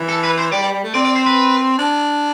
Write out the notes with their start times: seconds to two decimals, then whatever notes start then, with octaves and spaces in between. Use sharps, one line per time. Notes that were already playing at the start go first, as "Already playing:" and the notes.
Already playing: E3
0.09 A4
0.23 B4
0.38 C5
0.52 G3 D5
0.62 G3
0.73 G3
0.84 A3
0.94 C4 D5
1.05 D5
1.16 C5
1.26 B4
1.79 D4